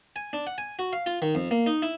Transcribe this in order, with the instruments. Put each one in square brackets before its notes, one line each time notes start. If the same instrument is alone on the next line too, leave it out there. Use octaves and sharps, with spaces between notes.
[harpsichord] G#5
D4
F#5
G#5
F#4
F5
F4
D#3
F2
A#3
D#4
E4